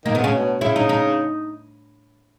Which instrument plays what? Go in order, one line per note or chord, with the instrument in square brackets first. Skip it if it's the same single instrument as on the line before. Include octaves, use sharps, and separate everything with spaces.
[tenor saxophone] D#3 [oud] A#3
[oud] B3
[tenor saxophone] C#3 [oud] C#4
[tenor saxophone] B2
[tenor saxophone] C#3 [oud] E4
[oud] D#4
D#4